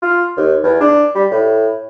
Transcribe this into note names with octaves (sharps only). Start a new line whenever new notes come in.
F4
D#2
E2
D4
G3
A2